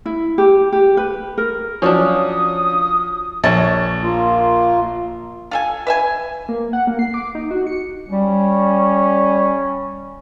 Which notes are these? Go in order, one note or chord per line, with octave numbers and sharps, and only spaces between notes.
E4
G4
G4
B4
A#4
F3 F#3 C#4 D4 C#5 D#6
A#1 C#5 A5
A#3 F4
F4 A4 G#5
B4 E5 G#5
A#3
F#5
A#3
C7
D6
D#4
F#4
C#7
G3 C#4